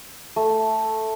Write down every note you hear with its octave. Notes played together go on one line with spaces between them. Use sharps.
A3